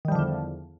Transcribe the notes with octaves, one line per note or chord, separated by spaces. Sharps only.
E2 D3 D#3 F3 G3